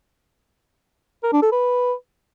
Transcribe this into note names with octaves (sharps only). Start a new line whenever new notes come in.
A#4
D4
A4
B4